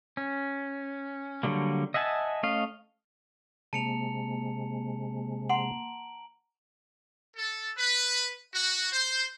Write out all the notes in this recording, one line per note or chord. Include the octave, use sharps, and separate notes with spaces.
C#4
D3 F#3 G3 A#3
D#5 E5 F#5 G#5 A5
A3 C#4 D#5 F5
C3 G#3 A#3 A5 C#7 F7
F#5 A#5 C6 D7 F#7
A4
B4
F#4
C5